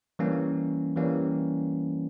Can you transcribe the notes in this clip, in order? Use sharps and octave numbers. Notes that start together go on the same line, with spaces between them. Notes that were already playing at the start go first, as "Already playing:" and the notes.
E3 G3 A#3 C#4
E3 G3 A#3 C#4